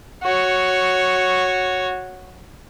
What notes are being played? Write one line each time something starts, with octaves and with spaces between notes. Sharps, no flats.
F#4 C#5